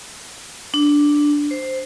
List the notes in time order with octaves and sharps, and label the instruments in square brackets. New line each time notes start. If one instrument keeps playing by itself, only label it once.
[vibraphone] D4
C5